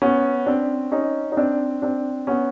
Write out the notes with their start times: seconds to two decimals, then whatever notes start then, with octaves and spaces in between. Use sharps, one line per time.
0.02 B3 C#4
0.46 C4 D4
0.92 C#4 D#4
1.32 D#4
1.37 C4 D4
1.82 C4 D4
2.27 B3 C#4